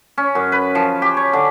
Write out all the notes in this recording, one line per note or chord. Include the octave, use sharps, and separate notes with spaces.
C#4
F#2
B4
F3
G4
C#5
D3